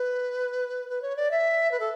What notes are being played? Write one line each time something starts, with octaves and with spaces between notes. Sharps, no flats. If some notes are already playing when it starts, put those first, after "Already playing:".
Already playing: B4
B4
C#5
D5
E5
B4
A4